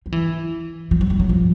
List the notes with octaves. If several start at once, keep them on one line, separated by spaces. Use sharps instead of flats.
F3
E3
F3
F#3
G3
F#3
F3